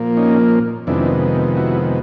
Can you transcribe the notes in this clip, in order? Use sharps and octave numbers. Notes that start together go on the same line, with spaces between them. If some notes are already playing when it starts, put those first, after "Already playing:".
Already playing: A#2 F3 A#3
C#4 D#4
F2 C3 D#3 G#3 B3 D4 E4
E4 F#4